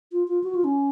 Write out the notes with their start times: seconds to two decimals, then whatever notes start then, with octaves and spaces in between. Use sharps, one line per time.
0.12 F4
0.28 F4
0.44 F#4
0.55 F4
0.64 C#4